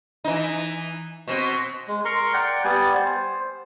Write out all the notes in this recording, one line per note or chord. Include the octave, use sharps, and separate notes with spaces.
E3 D#4
B2 C4
G#3
A#4 A#5 C6 C#6
D5 F#5 G5
G3 B3 D5 G#5
C5